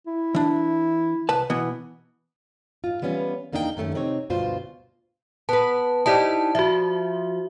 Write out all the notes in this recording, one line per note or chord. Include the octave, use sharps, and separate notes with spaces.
E4
E3 D4
C2 B4 A5
B2 E3 B3
G#2 F4
E3 G3 B3 C#4 F4
E2 A#3 D4 D#4 F4 G5
F#2 D#3 A3 C#4
C3 C4 D#4 G4 C#5
D2 G2 B2 F4 C5
B3 B4 A5
D#4 E4 G4 C5 D5 A5
F3 F#4 E5